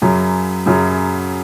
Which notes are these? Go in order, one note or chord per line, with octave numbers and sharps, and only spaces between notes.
F#2 C#3 F#3
F#2 C#3 F#3